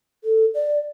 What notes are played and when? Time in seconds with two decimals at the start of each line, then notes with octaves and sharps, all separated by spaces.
0.24 A4
0.54 D5